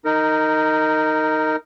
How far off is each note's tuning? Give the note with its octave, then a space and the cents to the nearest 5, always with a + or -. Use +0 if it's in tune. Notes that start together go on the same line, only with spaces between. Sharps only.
D#4 +0 A#4 -20